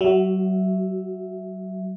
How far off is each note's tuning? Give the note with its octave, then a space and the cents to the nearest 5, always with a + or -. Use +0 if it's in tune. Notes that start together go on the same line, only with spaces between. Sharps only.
F#3 +35 F#4 +0 E5 +0